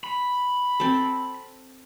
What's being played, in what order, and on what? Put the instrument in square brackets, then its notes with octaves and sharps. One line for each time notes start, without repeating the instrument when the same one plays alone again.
[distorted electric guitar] B5
[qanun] C4 A4